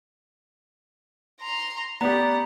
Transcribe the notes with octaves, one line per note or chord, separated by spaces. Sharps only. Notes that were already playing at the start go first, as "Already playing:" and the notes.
A#5 C6
B3 G4 D5 F#5 A#5